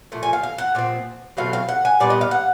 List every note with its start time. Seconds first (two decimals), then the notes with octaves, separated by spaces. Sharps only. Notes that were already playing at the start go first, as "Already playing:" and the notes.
0.12 A#2 F3 A3
0.23 G#5
0.33 F5
0.43 F5
0.58 F#5
0.75 A#2 F3 C4
1.37 B2 F#3 A3 C4 F5
1.53 F5
1.69 F#5
1.85 G#5
2.00 A#2 G3 B3 D5
2.10 D#5
2.21 F5
2.31 F#5